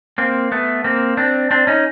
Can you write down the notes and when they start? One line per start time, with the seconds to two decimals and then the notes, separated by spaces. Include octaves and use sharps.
0.18 A#3 C4
0.52 A3 B3
0.84 A#3 C4
1.17 C4 D4
1.51 C4 D4
1.67 C#4 D#4